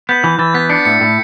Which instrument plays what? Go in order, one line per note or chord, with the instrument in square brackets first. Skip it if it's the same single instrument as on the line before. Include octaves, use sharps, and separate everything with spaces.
[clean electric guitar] B3 [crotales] G6
[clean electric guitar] E3
[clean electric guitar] E3 [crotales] A6
[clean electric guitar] B3 [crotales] B6
[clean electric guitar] D4 [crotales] C#7
[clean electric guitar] A2 [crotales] C#7
[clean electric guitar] A2